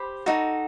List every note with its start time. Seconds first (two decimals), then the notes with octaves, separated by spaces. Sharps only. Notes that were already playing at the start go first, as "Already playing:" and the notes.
Already playing: G4 C5 B5
0.26 D#4 F#4 A4